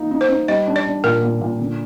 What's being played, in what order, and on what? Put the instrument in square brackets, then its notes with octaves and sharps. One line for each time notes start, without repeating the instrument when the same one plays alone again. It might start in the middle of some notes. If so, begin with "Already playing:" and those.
Already playing: [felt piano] D#3 A#3 D#4
D#4
[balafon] C5
[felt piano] D#4
[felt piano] G3 [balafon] D#5
[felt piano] D4
[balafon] D5
[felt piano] D4
[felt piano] A#2 [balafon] A#4
[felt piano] A#2
A#2
D3